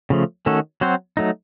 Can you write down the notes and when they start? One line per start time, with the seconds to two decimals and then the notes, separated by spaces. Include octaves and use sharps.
0.10 C#3 F3 A3
0.46 D#3 A3 C#4 F#4 A4
0.81 F#3 C4 F#4 C5
1.17 F#3 A3 D#4